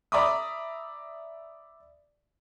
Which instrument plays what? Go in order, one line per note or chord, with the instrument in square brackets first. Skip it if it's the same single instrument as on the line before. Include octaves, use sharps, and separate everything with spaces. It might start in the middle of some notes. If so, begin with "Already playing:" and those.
[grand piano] D5 E5 A#5 B5 D6 D#6